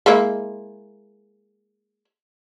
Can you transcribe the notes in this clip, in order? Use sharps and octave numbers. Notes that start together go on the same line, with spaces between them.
G#3 A#3 E4